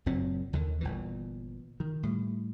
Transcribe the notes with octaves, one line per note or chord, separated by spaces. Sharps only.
F#1 F#2 A#2 C4
D#2 D3 D#3
G1 A#2 E3
D#3
A2 G3